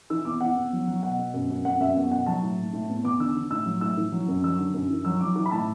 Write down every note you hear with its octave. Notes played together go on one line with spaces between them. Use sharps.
E3 E6
E2 D6
E2 F#5
E2
F#3
F#3
B2 F#5
B2
F#2
F#2
F#2 F#5
F#2 E5
E2 F#5
B2 F#5
F#3 A5
A2
A2
A2
E2
E2 D6
D3 E6
D3
A2 E6
F#3
A2 E6
E3
F#3
F#2
F#3 E6
D3
F#2
E3
F#3 E6
F#3 D6
E3 D6
B5
A2 A5